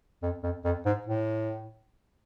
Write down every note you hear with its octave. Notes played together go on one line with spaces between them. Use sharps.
F2
F2
F2
G#2
A2